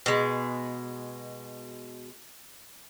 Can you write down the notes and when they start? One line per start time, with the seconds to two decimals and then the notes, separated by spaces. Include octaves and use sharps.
0.06 B2 G#3